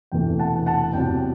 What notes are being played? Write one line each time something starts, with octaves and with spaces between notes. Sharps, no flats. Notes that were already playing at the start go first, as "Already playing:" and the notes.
E1 E2 C3 E3 A3 G5
F#5 A5
F#5 A5
E2 C3 F#3 G5